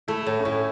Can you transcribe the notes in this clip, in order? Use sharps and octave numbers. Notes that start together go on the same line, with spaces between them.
A3 E4
A2
C#4
A2 E4